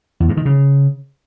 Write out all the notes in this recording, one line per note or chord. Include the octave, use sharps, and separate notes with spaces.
E2
G2
D#3
C#3